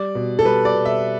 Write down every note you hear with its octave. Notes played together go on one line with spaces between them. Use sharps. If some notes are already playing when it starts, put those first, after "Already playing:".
Already playing: G3 D5
B2
A4
G3 B4
D5
B2
E5